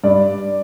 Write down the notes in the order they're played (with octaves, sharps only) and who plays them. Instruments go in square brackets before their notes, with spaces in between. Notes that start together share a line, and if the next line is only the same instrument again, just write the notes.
[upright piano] G2 D5